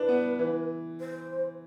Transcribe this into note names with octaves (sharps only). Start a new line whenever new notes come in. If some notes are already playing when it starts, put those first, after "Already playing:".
Already playing: D4 E4 B4
B3
E3
C5